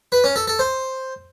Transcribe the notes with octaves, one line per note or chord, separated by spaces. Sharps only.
B4
C#4
A4
A4
C5